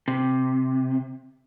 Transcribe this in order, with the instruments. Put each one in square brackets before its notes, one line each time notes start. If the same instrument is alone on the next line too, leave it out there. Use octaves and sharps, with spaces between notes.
[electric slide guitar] C3